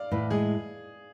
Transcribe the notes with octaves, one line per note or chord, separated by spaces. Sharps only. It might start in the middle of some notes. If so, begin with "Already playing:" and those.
Already playing: D5 F5
A2 B4
G#3 G#4